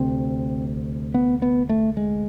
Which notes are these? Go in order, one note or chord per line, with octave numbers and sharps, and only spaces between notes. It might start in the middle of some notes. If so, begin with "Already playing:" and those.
Already playing: D2 C3 C4
B3
B3
A3
G#3